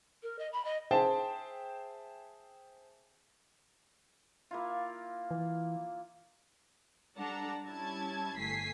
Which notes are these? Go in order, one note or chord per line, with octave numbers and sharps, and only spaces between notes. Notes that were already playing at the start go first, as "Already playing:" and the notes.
A#4
D#5
B5
D#5
G#4 C5 E5 G5 A5
A#3 E4 F4
E3
G3 D4 A4 F#5 A5 A#5
G3 C#4 E4 A5 G#6
G1 A3 G#5 B6 C7